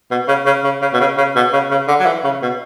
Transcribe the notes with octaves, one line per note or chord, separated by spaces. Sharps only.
B2
C#3
C#3
C#3
C#3
B2
C#3
C#3
B2
C#3
C#3
D3
F#3
E3
C#3
B2